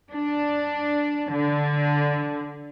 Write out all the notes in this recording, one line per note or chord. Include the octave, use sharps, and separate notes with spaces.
D4
D3